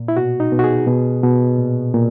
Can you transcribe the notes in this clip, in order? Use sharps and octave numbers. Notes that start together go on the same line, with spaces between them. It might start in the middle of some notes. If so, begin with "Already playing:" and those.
Already playing: A#2
E4
B2 F#4
D#4
B2
F#4
G#4
B2
B2
A#2
A#2